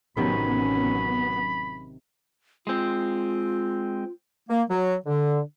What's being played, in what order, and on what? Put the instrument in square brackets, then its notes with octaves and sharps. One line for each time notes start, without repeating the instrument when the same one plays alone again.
[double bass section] A1 F#3 C#4 [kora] C3 D#3 [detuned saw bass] B3 [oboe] B5
[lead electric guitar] G#3 C4 [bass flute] F4
[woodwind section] A#3
F#3
D3